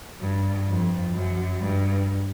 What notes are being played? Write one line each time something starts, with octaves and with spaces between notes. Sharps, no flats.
G2
F2
F#2
G2